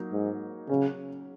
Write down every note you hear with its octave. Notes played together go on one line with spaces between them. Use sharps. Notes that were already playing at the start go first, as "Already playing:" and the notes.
Already playing: F#3 A#3 D#4
G#2
C#3 F#3 C#4